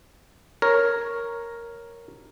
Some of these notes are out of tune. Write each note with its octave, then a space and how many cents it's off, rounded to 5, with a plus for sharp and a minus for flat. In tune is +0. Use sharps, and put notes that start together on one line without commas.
A#4 +0 C#5 -5